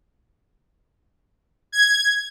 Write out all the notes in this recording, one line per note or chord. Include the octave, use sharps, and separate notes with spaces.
G#6